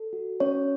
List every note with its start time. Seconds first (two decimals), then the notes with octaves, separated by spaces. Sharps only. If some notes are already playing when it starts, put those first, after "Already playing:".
Already playing: A4
0.13 F#4
0.40 C#4 C#5